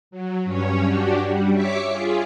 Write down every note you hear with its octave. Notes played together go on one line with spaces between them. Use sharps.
F#3
G2 C#4 C#5
D4 F#4 G4
G3
C#5 E5 D6 B6 C#7
F4 G#4